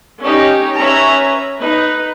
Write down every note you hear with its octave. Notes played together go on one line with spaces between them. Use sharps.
C#4 D#4 G4
C#4 B4 E5 A#5
D#4 B4